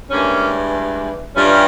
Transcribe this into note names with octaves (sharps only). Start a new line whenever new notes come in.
G2 E3 G#3 A#3 C#4
G2 E3 G3 C#4 F4